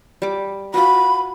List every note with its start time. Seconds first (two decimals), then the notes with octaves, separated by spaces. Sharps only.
0.22 G3 D6
0.74 F4 F#4 B5